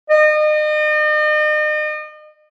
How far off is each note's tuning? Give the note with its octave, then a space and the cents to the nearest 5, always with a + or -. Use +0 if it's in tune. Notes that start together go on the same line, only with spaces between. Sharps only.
D#5 -40